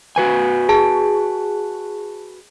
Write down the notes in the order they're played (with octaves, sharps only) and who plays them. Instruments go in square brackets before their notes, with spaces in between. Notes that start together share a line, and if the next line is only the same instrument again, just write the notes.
[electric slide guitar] F#4 B4 G#5
[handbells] G#4 A5